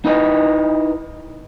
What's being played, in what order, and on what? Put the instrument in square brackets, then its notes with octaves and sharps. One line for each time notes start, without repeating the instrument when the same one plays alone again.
[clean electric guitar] D#4 E4 B4 D#5